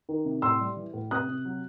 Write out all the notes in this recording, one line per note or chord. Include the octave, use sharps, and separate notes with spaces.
D#3
C3
A2 C6 E6
G3
E3
A2
C3 D#6 F#6
C3
F#3